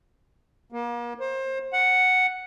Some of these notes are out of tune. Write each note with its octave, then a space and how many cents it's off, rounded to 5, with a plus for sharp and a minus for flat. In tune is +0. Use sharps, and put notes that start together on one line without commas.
A#3 +40
C5 +25
F#5 +0